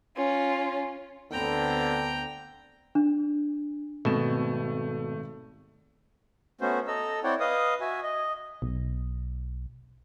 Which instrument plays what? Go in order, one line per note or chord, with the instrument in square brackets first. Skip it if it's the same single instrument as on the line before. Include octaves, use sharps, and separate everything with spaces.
[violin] C#4 F4
[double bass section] D2 B3 C4 [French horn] D3 [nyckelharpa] G5 A#5
[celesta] D4
[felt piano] G#1 C4 E7 [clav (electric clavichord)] B2 [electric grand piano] A3
[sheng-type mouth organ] A3 B3 C#4 F#4 C5
A4 D#5 A#5 E6
C4 E4 C#5 D5 F#5 G5
B4 D#5 F5 D#6
F#4 E5 G#5
D#5
[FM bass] B1